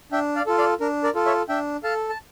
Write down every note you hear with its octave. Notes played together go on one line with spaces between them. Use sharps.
D4 E5 G5
D5 F5
F4 A4
D5 F5
D4 A#4
A#4 D5
F4 A4
C#5 E5
D4 E5 G5
A4 F5 A5
A5